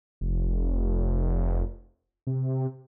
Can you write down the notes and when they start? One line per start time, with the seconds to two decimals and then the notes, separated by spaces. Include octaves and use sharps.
0.21 F1
2.27 C3